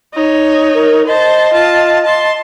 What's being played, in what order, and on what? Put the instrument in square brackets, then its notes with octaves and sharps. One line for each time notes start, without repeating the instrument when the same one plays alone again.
[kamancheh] D#4 C#5
[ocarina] A#4
[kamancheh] C5 A5 [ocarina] D#5
[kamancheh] F4 A5
A5 C6